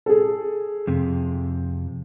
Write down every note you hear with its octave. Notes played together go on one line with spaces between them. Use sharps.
G#4 A4
F2 C3